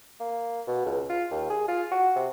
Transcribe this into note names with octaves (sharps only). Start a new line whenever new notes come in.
A#3
B2
C#2
F4
D#2
G#4
F4
F#4
C3